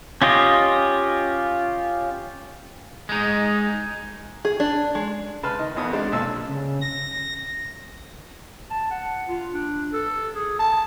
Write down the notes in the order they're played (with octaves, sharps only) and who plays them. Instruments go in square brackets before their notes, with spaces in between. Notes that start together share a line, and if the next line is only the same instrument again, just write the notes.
[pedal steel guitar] C#4 F4 G4 D#5
[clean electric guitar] G#3 D#4
[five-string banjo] G#4
D4
G#3
[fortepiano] C#3 B4 A5 C6 F6
D#3 D#5
A1 F2 D#3 B3 D#6
G#3 C4 D4
B1 A#2 D3 A5 E6
[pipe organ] C#3
A#6
[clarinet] A5
F#5
F4
D4
A4
G#4
A5